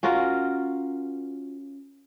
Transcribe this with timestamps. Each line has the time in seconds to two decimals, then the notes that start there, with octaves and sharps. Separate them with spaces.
0.03 C#4 F4 F#4 A#4